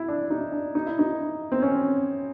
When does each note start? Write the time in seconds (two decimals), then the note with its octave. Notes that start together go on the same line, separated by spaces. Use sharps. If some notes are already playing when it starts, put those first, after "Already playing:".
Already playing: E4
0.08 D4
0.30 D#4
0.52 D4
0.75 D#4
0.86 E4
0.99 D#4
1.52 C4
1.62 C#4